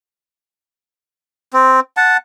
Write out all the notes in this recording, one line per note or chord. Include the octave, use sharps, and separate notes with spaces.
C4
F#5 A5